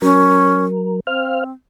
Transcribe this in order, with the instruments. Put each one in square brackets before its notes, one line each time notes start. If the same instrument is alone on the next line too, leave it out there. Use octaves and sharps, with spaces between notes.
[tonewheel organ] F#3 A#4 [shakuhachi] C#4
[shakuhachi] C4 [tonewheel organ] C5 F5 F6